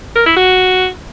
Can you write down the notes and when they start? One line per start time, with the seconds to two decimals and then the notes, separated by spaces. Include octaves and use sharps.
0.16 A#4
0.26 E4
0.36 F#4